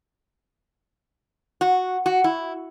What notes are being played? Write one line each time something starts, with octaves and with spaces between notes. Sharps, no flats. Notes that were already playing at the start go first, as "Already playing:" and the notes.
F#4
F#4
E4